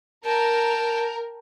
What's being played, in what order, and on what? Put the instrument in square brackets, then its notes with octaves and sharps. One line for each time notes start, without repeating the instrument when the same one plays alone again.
[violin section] A#4 [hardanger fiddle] G5 A5